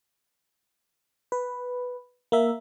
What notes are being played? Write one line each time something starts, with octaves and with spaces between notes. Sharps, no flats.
B4
A#3 A#4 E5